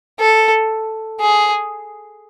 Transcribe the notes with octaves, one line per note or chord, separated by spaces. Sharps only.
A4
G#4